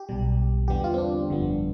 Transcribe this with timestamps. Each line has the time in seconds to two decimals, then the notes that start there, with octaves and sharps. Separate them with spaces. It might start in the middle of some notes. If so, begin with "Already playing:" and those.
Already playing: G4
0.09 B1 B2 G3
0.68 E2 D3 G3 B3 G4
0.84 F4
0.94 C4
0.98 D4
1.29 G1 F2 D3 G3 B3